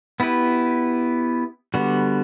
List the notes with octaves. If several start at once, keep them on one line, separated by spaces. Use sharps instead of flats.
B3 E4 G4 B4
D3 G3 B3 F#4